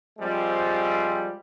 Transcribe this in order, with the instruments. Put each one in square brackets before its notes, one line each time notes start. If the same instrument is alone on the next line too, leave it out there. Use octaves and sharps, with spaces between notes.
[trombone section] F3 G3 G#3 C4